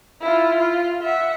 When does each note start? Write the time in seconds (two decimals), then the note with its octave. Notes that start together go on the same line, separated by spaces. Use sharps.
0.21 E4 F4
0.58 F4
1.02 E5 F#5